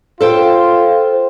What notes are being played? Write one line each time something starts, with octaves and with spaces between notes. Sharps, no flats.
F4 A4 C5 G5